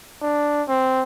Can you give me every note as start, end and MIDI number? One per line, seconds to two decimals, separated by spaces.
0.22 0.63 62
0.68 1.03 60